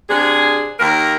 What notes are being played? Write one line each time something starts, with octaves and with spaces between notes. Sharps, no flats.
C3 D4 G#4
D#2 A#4